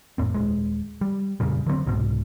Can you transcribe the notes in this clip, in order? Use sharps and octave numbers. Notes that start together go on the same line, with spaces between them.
F2 A2 C4
D#1 D#2 G#3
G3
F2 A#2 C#3 G3
D3 F#3 G#3 C4
C2 G#2 B2